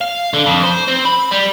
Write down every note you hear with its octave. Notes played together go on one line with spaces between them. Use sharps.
F5
D3
F2
C5
C4
B5
G3